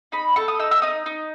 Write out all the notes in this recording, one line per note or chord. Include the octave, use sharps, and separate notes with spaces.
D#4 B5
A4 C#6
D#6
D#4 E6
E6
D#4 D#6
D#4